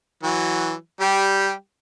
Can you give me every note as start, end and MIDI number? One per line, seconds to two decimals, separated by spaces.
0.23 0.73 52
0.23 0.73 54
1.00 1.52 55
1.00 1.52 67